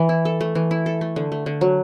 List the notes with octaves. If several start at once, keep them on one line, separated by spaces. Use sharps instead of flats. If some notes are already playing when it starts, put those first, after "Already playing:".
Already playing: E3
E4
A4
A3
E3
E4
A4
A3
D3
A3
D3
F#3